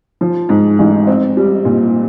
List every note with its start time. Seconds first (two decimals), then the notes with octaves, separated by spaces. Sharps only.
0.21 F3
0.49 G#2
0.79 A1
1.07 C4
1.37 G3
1.65 A#2